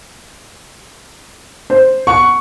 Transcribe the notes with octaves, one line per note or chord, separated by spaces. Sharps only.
C5
F#5 C#6